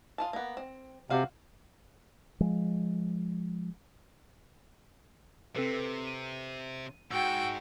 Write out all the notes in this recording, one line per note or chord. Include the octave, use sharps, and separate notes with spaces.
F4 G#4 A5
A#3 B3
C4
C3 F#4 F5
F3 G#3
C3 C4 A4 B4
D#7
G#2 F#4 G5 E6